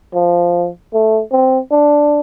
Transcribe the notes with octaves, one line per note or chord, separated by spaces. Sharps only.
F3
A3
C4
D4